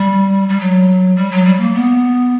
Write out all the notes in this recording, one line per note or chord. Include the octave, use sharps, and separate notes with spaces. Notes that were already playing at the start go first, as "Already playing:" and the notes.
Already playing: G3
G3
F#3
G3
F#3
G3
A#3
B3